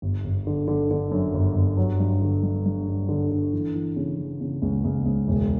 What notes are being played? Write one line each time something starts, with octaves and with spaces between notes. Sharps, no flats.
G1
G1
D3
D3
D3
F#2
G1
G1
F#3
G2
D3
G2
G2
G2
D3
D3
E3
E3
C#3
E3
C#3
C#2
C#2
C#2
E1